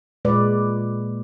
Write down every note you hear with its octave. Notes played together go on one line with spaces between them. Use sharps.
A#2 G#3 B4 D5